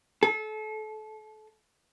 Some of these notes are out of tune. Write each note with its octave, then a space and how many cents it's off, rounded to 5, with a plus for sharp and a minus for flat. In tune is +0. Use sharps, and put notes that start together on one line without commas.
A4 -30